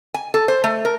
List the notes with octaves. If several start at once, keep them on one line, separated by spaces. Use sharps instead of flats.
G#5
A4
C5
A3
A#4